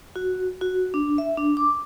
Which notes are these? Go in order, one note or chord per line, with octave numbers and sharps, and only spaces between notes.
F#4
F#4
D4
E5
D4
D6